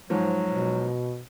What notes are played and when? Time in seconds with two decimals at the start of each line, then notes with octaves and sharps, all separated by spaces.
0.10 G#2 F3 F#3
0.51 B2